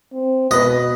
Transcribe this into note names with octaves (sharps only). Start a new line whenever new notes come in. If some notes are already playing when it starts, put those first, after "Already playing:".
C4
B2 B4 D#5 A#6